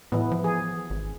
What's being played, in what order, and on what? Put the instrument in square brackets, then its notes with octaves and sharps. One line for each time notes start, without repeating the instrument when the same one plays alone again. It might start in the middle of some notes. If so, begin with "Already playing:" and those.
[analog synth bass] A2 [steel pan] E3 B3
[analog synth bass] F3
[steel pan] G#4
[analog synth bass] G#1